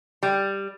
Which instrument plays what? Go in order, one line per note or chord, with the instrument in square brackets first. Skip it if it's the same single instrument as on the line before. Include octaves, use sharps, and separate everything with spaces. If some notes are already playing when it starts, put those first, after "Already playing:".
[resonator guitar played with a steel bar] G3